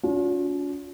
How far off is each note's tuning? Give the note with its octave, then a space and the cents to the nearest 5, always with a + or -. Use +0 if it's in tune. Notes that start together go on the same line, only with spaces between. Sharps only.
C#4 +45 F4 +45